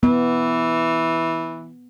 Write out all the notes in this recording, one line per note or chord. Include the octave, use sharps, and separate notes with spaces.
E3 B3